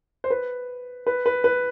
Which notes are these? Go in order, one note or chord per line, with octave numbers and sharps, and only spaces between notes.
C5
B4
B4
B4
B4